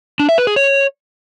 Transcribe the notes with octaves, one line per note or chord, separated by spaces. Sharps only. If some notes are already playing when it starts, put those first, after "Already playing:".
D4
E5
B4
G#4
C#5